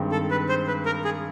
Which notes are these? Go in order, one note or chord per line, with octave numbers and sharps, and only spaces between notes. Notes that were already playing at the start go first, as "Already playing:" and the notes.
Already playing: G2 D#3 G#3 C4
A4
B4
C5
B4
A#4
G#4